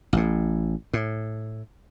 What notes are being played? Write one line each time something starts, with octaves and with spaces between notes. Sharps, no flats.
A1 A2
A2